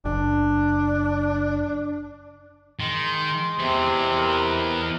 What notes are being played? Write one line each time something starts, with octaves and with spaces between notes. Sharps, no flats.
F#1 D4
D#3 G#3 C6
E2 C3 E3
A#4 B4 D#5